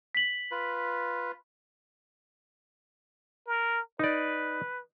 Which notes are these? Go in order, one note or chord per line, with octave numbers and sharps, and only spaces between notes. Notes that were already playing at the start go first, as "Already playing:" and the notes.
B6 F#7
F4 B4
A#4
D#4 B4 D5